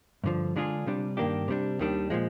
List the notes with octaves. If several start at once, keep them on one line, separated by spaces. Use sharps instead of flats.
G2 D3 F3
D3 G#3 D4 F4 G#4
C3 G3 D4
G2 D#3 A#3 D4 G4
C3 G3 D4
D#2 D#3 G3 D4
A#2 F3 G#3